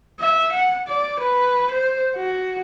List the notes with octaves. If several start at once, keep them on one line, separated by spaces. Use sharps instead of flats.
E5
F#5
D5
B4
C5
F#4